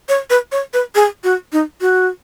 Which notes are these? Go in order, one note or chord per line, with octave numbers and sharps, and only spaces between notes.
C#5
B4
C#5
B4
G#4
F#4
D#4
F#4